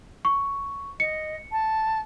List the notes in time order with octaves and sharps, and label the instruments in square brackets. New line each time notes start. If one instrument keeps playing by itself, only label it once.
[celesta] C#6
[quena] D#5 [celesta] C#7
[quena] A5